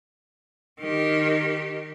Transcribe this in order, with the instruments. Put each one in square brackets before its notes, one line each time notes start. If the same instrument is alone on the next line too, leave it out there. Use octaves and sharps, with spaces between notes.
[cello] D#3 G4